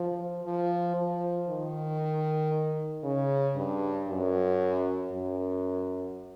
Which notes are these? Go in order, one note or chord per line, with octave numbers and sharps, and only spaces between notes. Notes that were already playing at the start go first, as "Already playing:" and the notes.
Already playing: F3
F3
F3
D#3
C#3
G2
F#2
F#2